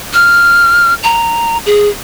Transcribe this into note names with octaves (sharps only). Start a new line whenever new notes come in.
F6
A#5
G#4